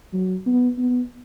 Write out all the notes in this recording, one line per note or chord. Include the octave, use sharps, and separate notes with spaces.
F#3
B3
B3